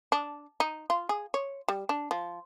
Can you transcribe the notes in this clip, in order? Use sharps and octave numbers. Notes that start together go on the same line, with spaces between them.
D4
D#4
F4
G#4
C#5
G3
D4
F3